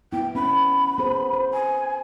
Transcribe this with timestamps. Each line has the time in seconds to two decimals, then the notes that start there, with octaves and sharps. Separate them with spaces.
0.13 B3 E4 G5
0.35 B3 C#4 B5
0.98 B3 G#4 C5
1.33 C5
1.53 G#5